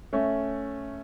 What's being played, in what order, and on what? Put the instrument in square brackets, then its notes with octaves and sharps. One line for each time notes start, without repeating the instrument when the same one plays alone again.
[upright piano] A3 C#4